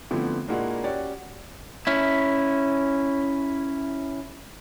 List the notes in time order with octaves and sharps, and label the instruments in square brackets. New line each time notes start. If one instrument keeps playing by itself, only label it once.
[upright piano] D3 F3 A3 B3 C4 E4
A#2 G#3 A#3 D4 E4 F#4
C#4 F#4 G4 C#5 D5
[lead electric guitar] C#4 E4